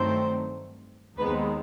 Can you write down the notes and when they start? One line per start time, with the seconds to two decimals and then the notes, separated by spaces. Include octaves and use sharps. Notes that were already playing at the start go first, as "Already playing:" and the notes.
Already playing: G2 D#3 F#3 A3 C4 C5
1.19 D#2 D#3 G#3 B3 C4 D#4 B4